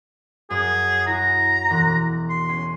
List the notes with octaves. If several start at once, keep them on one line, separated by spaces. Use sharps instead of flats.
F#2 G#4
E4 F#4 A#5
E1 F#6
C6
C#4